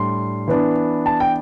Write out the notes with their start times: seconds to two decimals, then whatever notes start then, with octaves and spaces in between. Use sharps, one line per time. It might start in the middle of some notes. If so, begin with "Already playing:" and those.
Already playing: A2 G3 D4 C6
0.48 E3 B3 D4
1.06 A5
1.20 G5